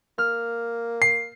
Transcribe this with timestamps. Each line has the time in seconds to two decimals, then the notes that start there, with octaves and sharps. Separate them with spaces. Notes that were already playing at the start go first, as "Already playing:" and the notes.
0.18 A#3 F6
1.02 C7